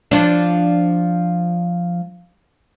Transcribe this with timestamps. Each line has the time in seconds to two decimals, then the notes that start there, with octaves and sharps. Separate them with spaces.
0.11 F3 D4